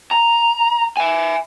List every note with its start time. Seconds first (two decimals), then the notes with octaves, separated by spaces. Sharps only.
0.11 A#5
0.97 E5 G#5